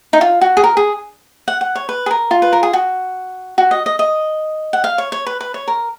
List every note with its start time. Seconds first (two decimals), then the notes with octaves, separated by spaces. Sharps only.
0.13 D#4
0.21 F4
0.41 F#4
0.57 G#4
0.64 A#4
0.77 G#4
1.48 F#5
1.61 F#5
1.76 C#5
1.89 B4
2.06 G#4
2.11 A#4
2.31 F4
2.42 B4
2.53 A#4
2.63 G#4
2.73 F#4
3.58 F#4
3.71 D#5
3.86 D#5
3.99 D#5
4.73 F#5
4.84 F5
4.98 C#5
5.12 C#5
5.27 B4
5.41 B4
5.54 C#5
5.68 A#4